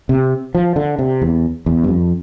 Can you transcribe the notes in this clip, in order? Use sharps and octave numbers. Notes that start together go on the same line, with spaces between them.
C3
F3
D3
C3
E2
E2
G2
F2